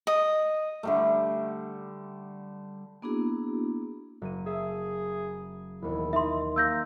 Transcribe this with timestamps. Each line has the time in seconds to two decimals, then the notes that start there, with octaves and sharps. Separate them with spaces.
0.07 D#5
0.83 D3 G3 A3
3.02 A#3 B3 D4 E4 F#4 G#4
4.22 F#1 D#7
4.46 G#4 E5 A5
5.82 E1 D#2 E4
6.13 D#4 E5 C6
6.56 A#3 D6 E6 G6 A#6